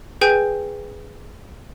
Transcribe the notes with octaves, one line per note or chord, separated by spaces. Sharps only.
G#4 B4 G5 G#5 G6